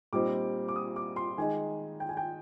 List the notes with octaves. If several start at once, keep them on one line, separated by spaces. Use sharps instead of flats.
A#2 G3 C4 D#4 D6
D6
D#6
D6
C6
D#3 G#3 D#4 G#5
G5
G#5
G5